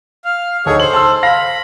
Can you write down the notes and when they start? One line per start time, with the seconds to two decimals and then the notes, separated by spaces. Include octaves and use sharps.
0.25 F5
0.66 D2 D#4 G#4 A4 C#5 C#6
0.80 C5 F#7
0.93 A5 C6 E6
1.23 F5 B5 A#6